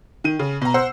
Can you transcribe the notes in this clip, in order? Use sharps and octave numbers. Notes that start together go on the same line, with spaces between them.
D#3 D#7
C#3
B2 A#5
C5 F#5 E6